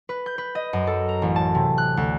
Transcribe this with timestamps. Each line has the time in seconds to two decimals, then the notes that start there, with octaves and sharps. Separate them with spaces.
0.09 B4
0.26 G6
0.38 B4
0.55 D#5
0.73 F#2
0.87 A4
1.09 A#5
1.22 A1
1.36 A5
1.55 C3
1.78 F#6
1.97 D2